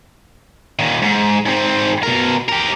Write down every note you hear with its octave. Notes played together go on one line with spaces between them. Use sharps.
A#2 D#3
G#2
G#2 C4
B2 A#4
G4 A#4